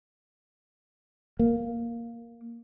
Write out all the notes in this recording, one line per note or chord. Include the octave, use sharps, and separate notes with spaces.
A#3